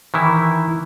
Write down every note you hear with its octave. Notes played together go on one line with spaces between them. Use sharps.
D#3 E3 E4